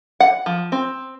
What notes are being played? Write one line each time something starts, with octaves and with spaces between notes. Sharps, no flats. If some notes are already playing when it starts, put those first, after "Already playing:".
F#5
F3
C4